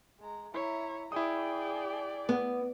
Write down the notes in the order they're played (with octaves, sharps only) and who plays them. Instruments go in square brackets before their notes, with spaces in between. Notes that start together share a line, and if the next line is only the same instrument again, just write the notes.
[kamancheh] G#3 A#5
[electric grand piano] E4 [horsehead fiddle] C#5 [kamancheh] E5 A#5
[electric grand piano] E4 D#6 [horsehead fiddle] G#4 G5 [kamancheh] D5
[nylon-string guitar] B3